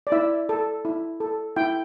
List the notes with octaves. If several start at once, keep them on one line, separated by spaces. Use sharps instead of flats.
D5
E4 E5
A4
E4
A4
E4 G5